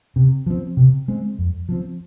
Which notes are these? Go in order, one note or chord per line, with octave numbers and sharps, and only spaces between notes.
C3
F3 C4
C3
G#3 C4
F2
F3 C4